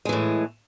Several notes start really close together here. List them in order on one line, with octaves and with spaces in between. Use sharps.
G#3 E3 A2